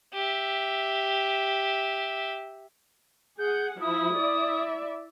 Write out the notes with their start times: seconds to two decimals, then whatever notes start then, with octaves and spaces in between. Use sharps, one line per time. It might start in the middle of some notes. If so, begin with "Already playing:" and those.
0.14 G4 E5
3.39 G#4 F#5 G6
3.81 F3 E4 D#6
4.16 E4 D5 E5